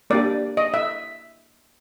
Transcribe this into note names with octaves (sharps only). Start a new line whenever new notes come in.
A#3 D4 G4 D5
D#5
E5